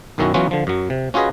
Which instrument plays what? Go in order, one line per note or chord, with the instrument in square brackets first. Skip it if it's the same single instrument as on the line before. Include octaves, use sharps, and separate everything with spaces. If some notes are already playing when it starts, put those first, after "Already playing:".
[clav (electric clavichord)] B1 F#2 D#3 C#4 E4 F#4
E3 F#3 B3 C#4 F4 F#4
D3 F3
F#2 F#3
C3
C#4 F4 F#4 G#4 B4 D#5